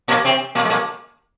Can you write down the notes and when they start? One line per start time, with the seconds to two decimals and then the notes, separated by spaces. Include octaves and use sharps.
0.08 A#2 A#3
0.24 C3 C4
0.55 A#2 A#3
0.65 G#3
0.70 A#2 A#3